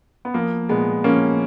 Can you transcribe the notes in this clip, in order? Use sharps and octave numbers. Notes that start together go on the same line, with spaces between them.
B3
F3 A#3
A#2 G#3 B3
F3 A#3 C#4